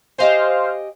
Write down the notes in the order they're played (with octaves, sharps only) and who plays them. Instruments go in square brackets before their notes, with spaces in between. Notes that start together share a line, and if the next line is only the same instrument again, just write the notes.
[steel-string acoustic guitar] G4 D#5 G#5 [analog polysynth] C5 F5